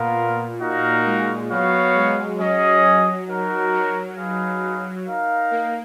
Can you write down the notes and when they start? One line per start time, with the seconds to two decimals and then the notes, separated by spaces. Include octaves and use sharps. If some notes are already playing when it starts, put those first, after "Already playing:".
Already playing: A#2 B3 F4 A#4 F5
0.61 D#4 F#4 A#4 F5
1.06 G#3
1.50 F#3 B3 F#4 C#5 F5
1.95 G#3
2.39 F#3 C#4 G#4 D#5
3.28 D#4 F#4 A#4
3.74 F#3
4.17 D#4 G#4 B4 F5
5.07 D#4 A#4 F5
5.51 A#3